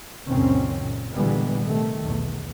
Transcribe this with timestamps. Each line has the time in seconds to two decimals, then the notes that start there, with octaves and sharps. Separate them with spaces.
0.28 C#2 F#2 A#2 D#3 C4 C#4
0.78 A#2
1.13 A#2 D3 E3 G3 G#3 B3
1.64 C3 D#3 A3
2.03 B1 E2